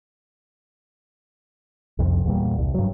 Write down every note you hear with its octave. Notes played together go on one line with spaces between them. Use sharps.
C2 F2
E2 A#2 G3
C2
G2 F#3